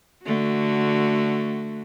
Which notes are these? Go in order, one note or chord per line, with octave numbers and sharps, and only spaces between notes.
D3 A3 F#4